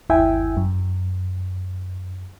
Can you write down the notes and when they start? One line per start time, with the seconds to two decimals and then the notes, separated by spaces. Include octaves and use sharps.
0.09 G1 D#2 E4 E5 G5 G#5
0.57 F#2